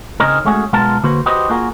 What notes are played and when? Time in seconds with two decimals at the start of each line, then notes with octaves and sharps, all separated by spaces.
0.20 C#3 C4 C#4 D#4 A#4
0.45 G#3 A3 C#4 F#4 G#4
0.73 B1 G#3 B3 F4 A#4 A5
1.03 D3 A#3 F#4 B4 C5
1.26 F#4 G4 B4 C5 D#5
1.50 A#3 F4 F#4 G#4 A#4